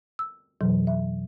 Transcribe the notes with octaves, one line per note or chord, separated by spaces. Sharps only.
E6
F2 B2 E3 F#3
E5